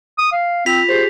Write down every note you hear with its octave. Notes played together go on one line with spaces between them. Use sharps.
D#6
F5
C4 F4 B6 F7
G4 G#4 C5